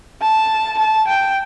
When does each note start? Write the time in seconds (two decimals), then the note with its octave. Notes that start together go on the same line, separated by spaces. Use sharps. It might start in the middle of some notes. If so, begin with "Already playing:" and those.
0.21 A5
0.79 A5
1.07 G5